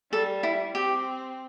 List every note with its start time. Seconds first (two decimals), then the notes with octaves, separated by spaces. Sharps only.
0.12 G3 A4
0.43 E4
0.75 C4 G4